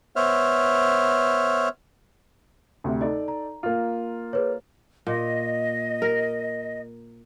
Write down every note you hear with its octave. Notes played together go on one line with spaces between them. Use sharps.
B3 C5 C#5 E5 F6
D2 C3
D#4 A4 D5 D#5
A#5
A#3 F4
G#4 B4 C#5
A#2 D#5
A#4